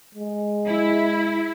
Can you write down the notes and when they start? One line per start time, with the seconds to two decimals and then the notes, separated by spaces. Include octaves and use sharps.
0.15 G#3
0.66 E4